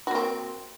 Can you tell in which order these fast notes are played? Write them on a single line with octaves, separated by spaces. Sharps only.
F#4 A#3 C4